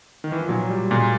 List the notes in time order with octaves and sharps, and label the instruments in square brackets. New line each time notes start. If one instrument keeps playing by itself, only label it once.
[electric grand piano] D#3
E3
F3
[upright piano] A#2 [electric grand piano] F#3
[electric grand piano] G3
[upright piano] A#2 [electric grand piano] G#3